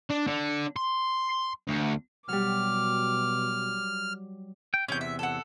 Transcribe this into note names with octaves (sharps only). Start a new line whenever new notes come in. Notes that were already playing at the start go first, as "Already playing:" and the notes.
D4
D3
C6
D2
B2 F#3 G3 D6 F6
G5
E2 G2 C3 C#4 G6
E5
A4 F#5